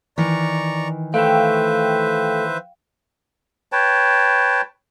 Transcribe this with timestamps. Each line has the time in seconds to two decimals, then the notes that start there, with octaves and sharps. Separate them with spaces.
0.18 D#3 E3 D5 A#5 C#6
1.14 A3 B4 C5 E5 F5 G5
3.72 B4 C#5 G5 A5